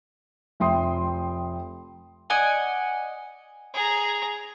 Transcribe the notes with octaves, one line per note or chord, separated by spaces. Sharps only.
F1 E5 G5 C6 D#6
D5 D#5 F#5 G#5
G#4 A#5